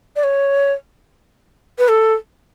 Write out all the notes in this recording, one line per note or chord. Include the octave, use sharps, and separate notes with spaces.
D5
C#5
B4
A4